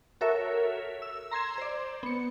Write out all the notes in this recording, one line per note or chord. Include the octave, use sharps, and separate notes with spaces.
F#4 A4 A#4 C#5 E5
E6
A#5 C6 G#6 E7
C5 D5
B3 C#7